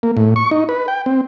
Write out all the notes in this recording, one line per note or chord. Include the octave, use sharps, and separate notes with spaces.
A#3
A2
C#6
D#4
B4
G5
C4